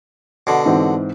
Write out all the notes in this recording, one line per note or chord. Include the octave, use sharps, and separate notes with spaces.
B2 D3
G#2 E3 C4